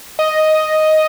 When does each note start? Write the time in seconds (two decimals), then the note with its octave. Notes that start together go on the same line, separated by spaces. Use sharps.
0.19 D#5